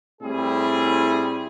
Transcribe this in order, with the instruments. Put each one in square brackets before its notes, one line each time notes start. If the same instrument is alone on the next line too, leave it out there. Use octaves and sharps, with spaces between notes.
[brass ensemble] A2 G3 C4 E4 G#4